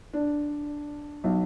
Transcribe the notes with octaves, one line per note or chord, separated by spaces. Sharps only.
D4
B1